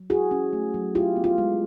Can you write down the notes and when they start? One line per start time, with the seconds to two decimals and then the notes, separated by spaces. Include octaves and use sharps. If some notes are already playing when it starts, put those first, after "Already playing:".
Already playing: F#3
0.10 E4 F#4 G#4
0.31 C#4
0.53 A3
0.74 F#3
0.95 E4 F4 G4
1.16 B3
1.24 F4
1.38 G#3